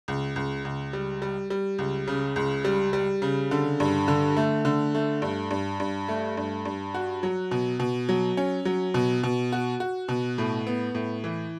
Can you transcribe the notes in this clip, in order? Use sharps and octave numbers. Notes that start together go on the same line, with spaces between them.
C#2
C#2
C#2
G3
G3
G3
C#2
C#3
C#2
G3
G3
C#3
D3
G2
D3
A3
D3
A3
G2
G2
G2
A3
G2
G2
F#4
F#3
B2
B2
F#3
C#4
F#3
B2
B2
F#4
F#4
B2
A2
B3
A2
E3